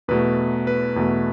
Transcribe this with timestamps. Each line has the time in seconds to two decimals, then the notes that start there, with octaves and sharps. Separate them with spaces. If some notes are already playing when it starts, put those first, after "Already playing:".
0.08 E2 B2 A3 B4
0.67 B4
0.96 E2 B2 A3